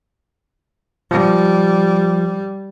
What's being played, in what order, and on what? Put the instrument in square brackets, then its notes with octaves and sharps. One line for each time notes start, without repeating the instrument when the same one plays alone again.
[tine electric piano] F3 [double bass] G3